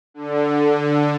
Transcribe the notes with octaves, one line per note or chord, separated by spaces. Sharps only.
D3